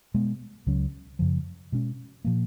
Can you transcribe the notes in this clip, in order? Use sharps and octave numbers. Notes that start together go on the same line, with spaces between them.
B2 G#3 B3
C#2 C#3 F#3 C#4
F#2 C#3 F3
B2 G#3 C#4
A#2 F3 A#3